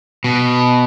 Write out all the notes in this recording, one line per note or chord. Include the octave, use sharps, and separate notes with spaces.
B2